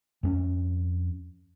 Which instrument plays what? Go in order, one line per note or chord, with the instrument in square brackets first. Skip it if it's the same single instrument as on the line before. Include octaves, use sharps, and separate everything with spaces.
[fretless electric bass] F2 A#3 C#4